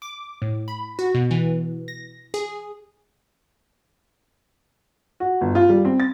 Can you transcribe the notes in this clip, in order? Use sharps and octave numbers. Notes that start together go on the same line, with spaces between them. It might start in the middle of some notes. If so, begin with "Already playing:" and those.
D6
A2
B5
F#4
B2
E3
A#6
G#4
F#4
G1
F4
G3
C4
A6